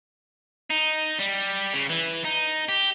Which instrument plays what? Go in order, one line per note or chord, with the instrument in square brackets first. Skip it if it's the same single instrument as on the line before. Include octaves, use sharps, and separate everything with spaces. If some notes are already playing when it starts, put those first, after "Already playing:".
[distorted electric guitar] D#4
G3
C#3
E3
D#4
G4